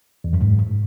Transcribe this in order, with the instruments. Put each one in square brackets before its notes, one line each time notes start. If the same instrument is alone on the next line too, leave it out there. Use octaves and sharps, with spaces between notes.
[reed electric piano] E2
F#2
G#2